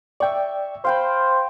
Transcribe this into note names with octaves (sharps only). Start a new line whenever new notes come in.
D5 E5 G5 C#6
C5 F5 G5 B5 C6